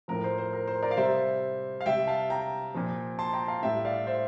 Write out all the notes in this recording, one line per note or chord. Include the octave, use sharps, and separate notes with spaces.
A2 F3 A#4
C5
C5
A#4
C5
A#4 D5
F5
C3 G3 C5 E5
F5
C3 G3 E5 G5
F5 A5
G5 A#5
A#2 F3
A5 C6
G5 A#5
F5 A5
A2 G3 E5 G5
D5 F5
C5 E5